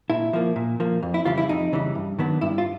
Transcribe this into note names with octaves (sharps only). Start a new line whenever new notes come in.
A#2 E4
F3 A#3
A#2
F3 A#3
F2
E4
C#3 E3 G3 F4
E4
F2 D#4
C#3 E3 G3
G2
D#3 F#3 B3 D4
G2 E4
F4